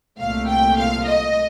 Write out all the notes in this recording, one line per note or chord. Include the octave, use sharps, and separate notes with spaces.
C2 A#2 A3 F5
G5
F5
D#5